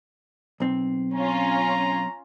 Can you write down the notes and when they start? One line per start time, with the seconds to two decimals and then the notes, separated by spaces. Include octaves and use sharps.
0.60 B1 C4
1.14 C#4 F4 A#5